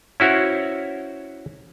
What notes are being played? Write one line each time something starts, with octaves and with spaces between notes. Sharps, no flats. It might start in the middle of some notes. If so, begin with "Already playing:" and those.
C#4 E4 F#4 C5 C#5